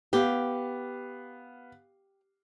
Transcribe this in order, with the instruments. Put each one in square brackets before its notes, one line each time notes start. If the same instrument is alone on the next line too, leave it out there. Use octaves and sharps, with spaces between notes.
[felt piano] B3 F5 [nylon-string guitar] G4